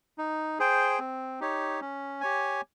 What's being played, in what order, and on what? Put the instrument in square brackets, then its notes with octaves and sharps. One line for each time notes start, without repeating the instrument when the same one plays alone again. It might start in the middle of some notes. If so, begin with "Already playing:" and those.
[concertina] D#4
G#4 C5 G5
C4
D#4 G4 C#5
C#4
G4 C#5 G#5